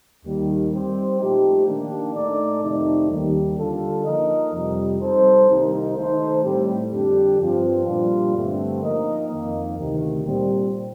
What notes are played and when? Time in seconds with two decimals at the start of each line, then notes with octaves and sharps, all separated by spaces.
0.24 D#2 D#3 G3
0.71 G3 C4 G4 C5
1.19 A#2 F3 A3 D#4 G4
1.67 D#3 A#3 D4
2.15 A2 A3 D#4 A4 D5
2.62 F2 C3 D#3 A3 D#4
3.10 D#2 D#3 G3
3.57 D3 G3 D4 F4 A4
4.05 F3 A#3 D#4 A#4 D#5
4.53 F2 C3 G3
5.00 G3 C4 D#4 A4 C5
5.48 C2 C3 D#3 A#3 D#4
5.96 D#3 A3 D#4 A4 C5
6.43 A2 G3 C4 G4
6.92 F2 D3 G3 D4 G4
7.38 G2 F3 C4
7.86 A#2 G3 D4 F4
8.34 G2 D3 A3 C4
8.82 F3 A#3 D#4 A#4 D#5
9.29 F2 D#3 A#3
9.78 D2 C3 D#3
10.25 A#2 G3 C4